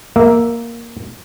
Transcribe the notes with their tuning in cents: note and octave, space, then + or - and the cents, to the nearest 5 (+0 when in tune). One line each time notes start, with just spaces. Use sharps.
A#3 +0 E5 +0